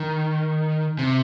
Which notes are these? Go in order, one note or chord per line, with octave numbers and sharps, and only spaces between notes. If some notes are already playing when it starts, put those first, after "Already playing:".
Already playing: D#3
C3